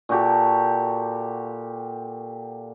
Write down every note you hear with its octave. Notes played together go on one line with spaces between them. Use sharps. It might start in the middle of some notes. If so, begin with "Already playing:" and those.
A#2 F#4 G4 A4